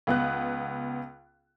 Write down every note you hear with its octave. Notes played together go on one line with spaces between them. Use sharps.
C#2 B3 F#6